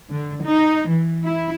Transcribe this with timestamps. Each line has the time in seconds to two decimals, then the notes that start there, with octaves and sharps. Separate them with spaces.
0.11 D3
0.43 D#4
0.89 E3
1.24 E4